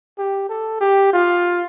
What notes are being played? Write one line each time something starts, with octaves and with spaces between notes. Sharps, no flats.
G4
A4
G4
F4